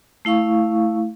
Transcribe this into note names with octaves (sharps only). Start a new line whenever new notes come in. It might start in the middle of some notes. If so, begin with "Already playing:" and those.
A3 E4 F5 C#6